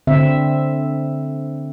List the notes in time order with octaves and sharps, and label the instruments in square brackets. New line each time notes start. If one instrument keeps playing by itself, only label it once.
[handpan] D3 C4 E5